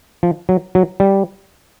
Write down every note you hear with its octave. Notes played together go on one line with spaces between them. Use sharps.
F3
F#3
F#3
G3